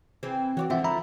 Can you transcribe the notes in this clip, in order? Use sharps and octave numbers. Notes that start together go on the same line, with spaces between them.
E3 C4 G#4
E3 F#4 C#5 D5
G#2 D3 F3 C4 E5 F#5
E5 A#5 B5